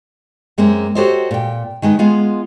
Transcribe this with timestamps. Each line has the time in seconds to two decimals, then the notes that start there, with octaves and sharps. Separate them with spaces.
0.58 F#2 G#3 A#3 C4 C#4
0.95 F#4 G4 A4 C5 C#5 D#5
1.31 A#2 G5
1.82 D#3 G#3 D#4 B4
1.99 G#3 B3 F4 G#4